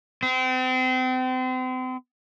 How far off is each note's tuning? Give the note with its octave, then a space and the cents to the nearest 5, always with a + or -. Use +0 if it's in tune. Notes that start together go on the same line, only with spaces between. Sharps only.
C4 -35